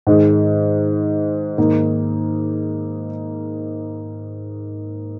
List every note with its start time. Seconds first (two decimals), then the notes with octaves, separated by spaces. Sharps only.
0.07 G#2 D#3 G#3
1.58 G#2 D#3 A#3 D#4